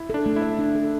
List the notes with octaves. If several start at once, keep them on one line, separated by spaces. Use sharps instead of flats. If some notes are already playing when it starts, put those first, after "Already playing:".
Already playing: E4
D4 A4
A3
E4
E5
D4
A4